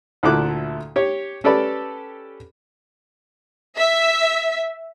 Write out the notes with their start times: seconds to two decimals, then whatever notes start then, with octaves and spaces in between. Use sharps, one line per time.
0.23 D2 A#2 E4 A4 D6 F#6
0.96 G4 C#5
1.44 C#4 G4 A4 B4 D5 B5
3.77 E5